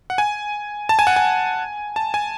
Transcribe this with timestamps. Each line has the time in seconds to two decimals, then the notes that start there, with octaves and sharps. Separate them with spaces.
0.10 F#5
0.18 G#5
0.89 A5
0.99 G#5
1.07 F#5
1.16 G#5
1.96 A5
2.14 G#5